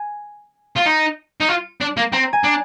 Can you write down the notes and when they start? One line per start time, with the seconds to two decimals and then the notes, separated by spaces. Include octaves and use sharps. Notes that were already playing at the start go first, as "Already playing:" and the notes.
Already playing: G#5
0.77 F4
0.86 D#4
1.41 D#4
1.49 F4
1.81 D4
1.97 A#3
2.13 C4 A#5
2.33 G#5
2.44 D4